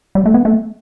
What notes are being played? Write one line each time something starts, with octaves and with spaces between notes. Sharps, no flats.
G3
A3
B3
A3